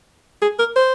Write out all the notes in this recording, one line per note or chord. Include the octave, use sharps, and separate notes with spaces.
G#4
A#4
C5